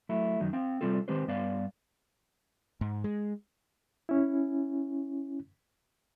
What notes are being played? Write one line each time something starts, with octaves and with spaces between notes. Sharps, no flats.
F#3 A3 E4
F#2 D#3 F#3 D#4
C4 F5 G5
C3 G3 C4 F4 A4
D#3 G#3 C4 G4 B4 C5
G2 B3 D5 F5
G#2
G#3
C#4 E4